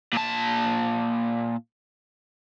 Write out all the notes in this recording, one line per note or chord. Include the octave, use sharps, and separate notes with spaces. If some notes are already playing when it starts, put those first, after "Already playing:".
A#2 A5